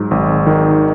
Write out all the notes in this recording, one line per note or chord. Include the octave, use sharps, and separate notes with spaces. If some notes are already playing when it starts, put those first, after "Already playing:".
Already playing: G#2 F#3
G#1
D#3